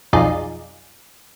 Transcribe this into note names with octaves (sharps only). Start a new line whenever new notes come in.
B1 F2 D#4 F4 G#4 D5